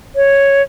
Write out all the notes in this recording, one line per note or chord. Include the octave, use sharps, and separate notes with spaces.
C#5